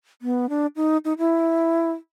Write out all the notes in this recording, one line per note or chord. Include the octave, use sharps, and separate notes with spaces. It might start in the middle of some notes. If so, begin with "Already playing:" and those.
B3
D4
D#4
D#4
E4